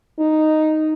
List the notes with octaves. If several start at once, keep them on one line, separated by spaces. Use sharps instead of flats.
D#4